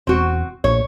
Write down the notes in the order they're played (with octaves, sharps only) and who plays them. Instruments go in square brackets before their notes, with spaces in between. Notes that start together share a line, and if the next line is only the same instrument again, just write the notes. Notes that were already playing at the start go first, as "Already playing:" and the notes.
[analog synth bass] E1 [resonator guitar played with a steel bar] C4 F#4
[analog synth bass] A#1 [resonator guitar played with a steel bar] C#5